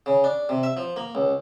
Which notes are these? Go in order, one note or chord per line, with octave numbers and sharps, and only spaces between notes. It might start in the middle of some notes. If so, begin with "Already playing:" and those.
C#3
D4
C3
E5
F3
A#3
C#2